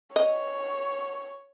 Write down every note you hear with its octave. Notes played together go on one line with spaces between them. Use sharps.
C#5 D#5